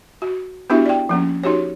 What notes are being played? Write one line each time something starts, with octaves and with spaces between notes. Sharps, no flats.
F#4
B3 D4 E4 F#4 G4 E5
D5 G5
F3 A#3 C#4
D#4 F#4 G4 C#5